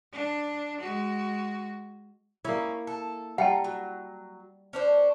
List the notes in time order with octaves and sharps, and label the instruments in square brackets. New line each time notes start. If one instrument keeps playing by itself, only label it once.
[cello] D4
G#3 F#4
[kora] A#3 E4 [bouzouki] C#4 D#4
[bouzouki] A4
[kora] G3 [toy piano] F#5 G5 A5 [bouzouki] A#5
[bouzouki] F#3
C#4 D4 C5